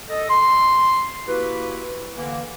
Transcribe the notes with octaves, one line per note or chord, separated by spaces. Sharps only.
A4 D#5
C6
A#3 E4 F#4 G4 B4
D3 E3 A#3